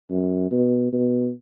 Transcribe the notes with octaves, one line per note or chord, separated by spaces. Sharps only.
F#2
B2
B2